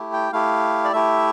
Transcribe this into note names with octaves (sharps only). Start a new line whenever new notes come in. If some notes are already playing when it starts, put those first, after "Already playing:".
Already playing: A3 E4 G4
G5
A3 E4 G4 F5
D5
A3 E4 G4 E5